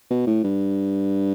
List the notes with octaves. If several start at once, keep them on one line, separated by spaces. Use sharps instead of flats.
B2
A2
G2